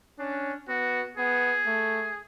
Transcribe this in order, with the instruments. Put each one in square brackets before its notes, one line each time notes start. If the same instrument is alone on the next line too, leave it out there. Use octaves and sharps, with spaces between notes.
[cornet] C#4 [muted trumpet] D4
[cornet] B3 [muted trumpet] F#4
[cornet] B3 [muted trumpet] G#4
[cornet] A3